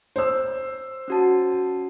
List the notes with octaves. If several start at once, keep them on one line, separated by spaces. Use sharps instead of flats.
C5 E6
C#4 F#4 A5